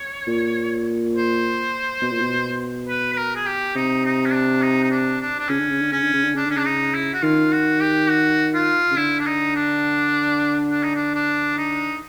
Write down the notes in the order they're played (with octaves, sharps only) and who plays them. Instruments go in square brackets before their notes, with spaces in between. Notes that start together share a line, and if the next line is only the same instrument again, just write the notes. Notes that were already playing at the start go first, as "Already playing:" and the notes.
Already playing: [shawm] C#5
[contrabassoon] A#2
[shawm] C5
[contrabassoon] B2
A#2
B2
[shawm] B4
B4
A#4
G#4
G4
[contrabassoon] C3 [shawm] D#4
[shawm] D#4
C#4
D4
D#4
D#4
D4
D4
D4
[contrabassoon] C#3 [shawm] C#4
[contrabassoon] D3
C#3
D3
[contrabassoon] C#3 [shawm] C#4
[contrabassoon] D3
C#3
D3
[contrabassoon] C#3 [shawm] D4
[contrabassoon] D3 [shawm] C#4
[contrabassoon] C#3 [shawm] D4
[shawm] D#4
E4
F#4
[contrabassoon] D#3 [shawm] F4
[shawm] F#4
G4
F#4
F4
[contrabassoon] C#3
[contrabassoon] D3 [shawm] E4
[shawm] D4
D#4
D4
D4
D#4
D4
D4
D#4